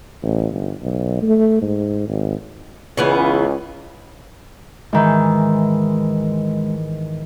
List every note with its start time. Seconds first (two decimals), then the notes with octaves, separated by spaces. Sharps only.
0.23 A1
0.52 G1
0.82 B1
1.22 A3
1.62 G#2
2.08 G#1
2.97 C#2 C#3 E3 B3
4.93 G#2 D#3 E3 G#3